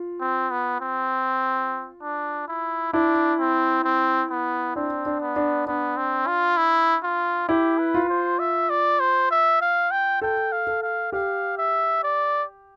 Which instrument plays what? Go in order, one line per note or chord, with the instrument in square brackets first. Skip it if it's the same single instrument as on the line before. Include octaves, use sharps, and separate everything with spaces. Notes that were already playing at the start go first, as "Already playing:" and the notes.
Already playing: [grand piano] F4
[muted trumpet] C4
B3
C4
D4
E4
[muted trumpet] D4 [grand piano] E4
[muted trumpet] C4
C4
B3
[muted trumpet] C4 [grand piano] D4
[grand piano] D4
[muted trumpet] B3
[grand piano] D4
[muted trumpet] B3 [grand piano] D4
[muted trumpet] C4
F4
E4
F4
[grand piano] E4 [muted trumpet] G4
[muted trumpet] B4
[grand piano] F4
[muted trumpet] C5
E5
D5
C5
E5
F5
G5
[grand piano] A4 [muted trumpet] G5
[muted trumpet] F5
[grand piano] A4
[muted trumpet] F5
[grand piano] G4 [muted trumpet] F5
[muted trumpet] E5
D5